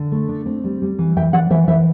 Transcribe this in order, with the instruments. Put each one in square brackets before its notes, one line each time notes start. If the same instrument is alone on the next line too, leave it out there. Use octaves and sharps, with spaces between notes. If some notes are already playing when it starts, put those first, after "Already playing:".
Already playing: [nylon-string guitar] D3
A3
D4
C4
G3
G3
E3
E3 E5 G5
E3 D5 F#5
E3 C5 E5
E3 C5 E5